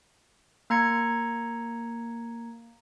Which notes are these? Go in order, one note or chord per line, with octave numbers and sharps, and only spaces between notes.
A#3 A#5 G#6 C#7